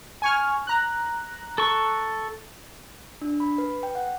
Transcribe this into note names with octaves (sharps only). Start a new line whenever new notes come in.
G#5 C#6 F6
A#5 F#6
A4 C#6
D4
B5
B4
G5
F#5